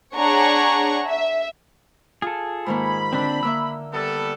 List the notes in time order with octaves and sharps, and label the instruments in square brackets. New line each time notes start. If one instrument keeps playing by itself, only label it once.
[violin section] D4 G#4 C#5 F#5 A#5 C#6
E5
[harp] F4 [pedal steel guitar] G#4 A4
[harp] G#2 D#3 A#3 [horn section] B5
[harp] D3 [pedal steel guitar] C4 D4
[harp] D3 A#3 E5 [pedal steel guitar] E6
[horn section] G3 B3 A4